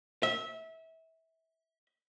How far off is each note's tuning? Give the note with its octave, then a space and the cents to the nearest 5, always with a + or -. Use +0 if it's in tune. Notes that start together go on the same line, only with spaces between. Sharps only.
E5 -25